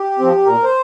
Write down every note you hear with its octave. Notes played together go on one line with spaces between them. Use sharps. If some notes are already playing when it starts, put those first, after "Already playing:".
Already playing: G4
F3 C4
A#2 A#4
C5